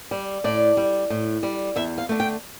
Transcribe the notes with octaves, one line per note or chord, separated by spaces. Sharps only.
G3
A2 D5
G3
A2
G3
E2 E5
F5
D3 A3
G5